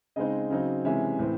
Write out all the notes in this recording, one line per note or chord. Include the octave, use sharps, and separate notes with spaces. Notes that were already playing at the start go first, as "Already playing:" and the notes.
C#3 G#3 C4 D#4 D#5
C#3 F#3 C4 D#4
C3 E3 G#3 C#4 E5
A2 E3 C4